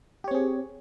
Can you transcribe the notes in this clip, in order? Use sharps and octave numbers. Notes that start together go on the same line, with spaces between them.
C4 G4 G#4 C#5